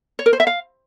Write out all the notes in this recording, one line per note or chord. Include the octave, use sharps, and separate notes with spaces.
C#5
A#4
C5
E5
F5